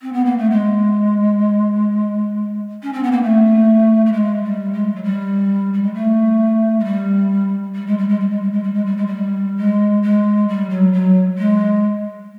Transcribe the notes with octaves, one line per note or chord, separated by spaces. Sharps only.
C4
B3
A#3
A3
G#3
C#4
C4
B3
A#3
A3
A3
G#3
G3
G#3
F#3
G3
G3
G#3
A3
G#3
G3
G3
G#3
G3
G#3
G3
G#3
G3
G#3
G3
G#3
G3
G#3
G3
G#3
G#3
G3
F#3
F#3
G#3